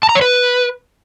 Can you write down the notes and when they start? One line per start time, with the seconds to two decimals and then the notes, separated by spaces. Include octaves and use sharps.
0.03 A5
0.09 A#5
0.15 C#5
0.21 B4